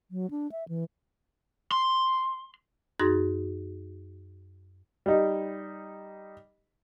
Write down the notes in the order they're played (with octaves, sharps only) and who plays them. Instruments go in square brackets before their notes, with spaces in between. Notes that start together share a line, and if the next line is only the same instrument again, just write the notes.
[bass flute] F#3
D4
E5
E3
[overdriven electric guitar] C6
[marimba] F#2 D#4 F#4 G#4 C6 A#6
[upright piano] G3 D#4